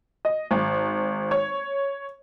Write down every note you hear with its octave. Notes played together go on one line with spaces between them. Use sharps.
D#5
G#1
C#5